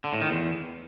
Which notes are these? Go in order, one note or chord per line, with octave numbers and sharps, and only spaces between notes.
D3
A2
D#3
E2